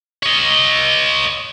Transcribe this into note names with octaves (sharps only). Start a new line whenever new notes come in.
C#5 D#5